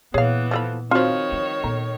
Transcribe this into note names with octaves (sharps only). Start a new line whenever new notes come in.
A#2 E3 B3 G#4 C#5 F5
F3 A4 B5
D#3 F3 C4 F4 F#4 C5 C#5
G3
A#2 B3